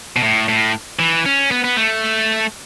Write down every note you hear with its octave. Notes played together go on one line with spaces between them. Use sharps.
B2
A2
A2
E3
C#4
B3
B3
A3